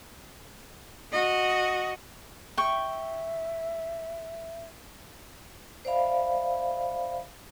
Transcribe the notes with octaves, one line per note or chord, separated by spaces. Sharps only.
F#4 D#5
E5 G5 C#6
C5 D5 E5 F5 B5